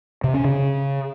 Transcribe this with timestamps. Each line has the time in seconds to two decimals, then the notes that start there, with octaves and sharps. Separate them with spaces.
0.24 C3
0.34 C#4
0.44 C#3